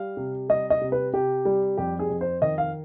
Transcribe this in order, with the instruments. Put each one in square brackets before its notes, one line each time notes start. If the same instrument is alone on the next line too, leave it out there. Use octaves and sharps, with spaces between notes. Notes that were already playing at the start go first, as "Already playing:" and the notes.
Already playing: [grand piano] G3 F5
C3
G3 D#5
D#5
C3
B4
C3 G4
G3
F2 G4
G#4
F2
C5
D#3 D#5
F5